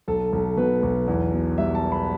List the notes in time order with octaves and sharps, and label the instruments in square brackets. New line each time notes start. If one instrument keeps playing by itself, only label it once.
[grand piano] B1 A4
B1
B2 B4
B1
E2
B2
G3 E5
A5
B3
B5